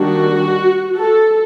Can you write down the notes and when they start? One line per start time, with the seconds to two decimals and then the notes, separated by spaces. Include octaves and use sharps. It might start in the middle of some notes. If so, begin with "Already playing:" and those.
Already playing: D#3 G3 A#3 D4 F#4
0.98 A4